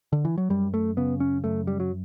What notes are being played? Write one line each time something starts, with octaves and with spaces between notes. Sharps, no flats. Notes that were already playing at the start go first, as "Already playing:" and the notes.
D3
E3
F#3
F#2 G3
A3
C#3 B3
C#4
F#2 A3
G3
F#3